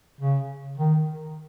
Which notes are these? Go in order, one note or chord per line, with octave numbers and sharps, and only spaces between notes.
C#3
D#3